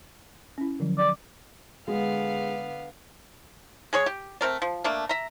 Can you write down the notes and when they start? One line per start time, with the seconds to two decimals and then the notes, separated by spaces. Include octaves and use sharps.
0.58 C#4 E4
0.80 D3 F3 F#3
0.98 D5
1.88 D3 G#3 B3 F5
3.93 G#3 G#4 C#5
4.06 G4
4.41 A3 C4 A#4 D5
4.62 F3
4.84 A3 A#3 D4
5.09 E5 A#5